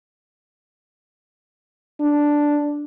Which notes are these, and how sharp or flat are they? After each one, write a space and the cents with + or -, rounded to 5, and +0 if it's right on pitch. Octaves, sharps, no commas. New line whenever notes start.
D4 +0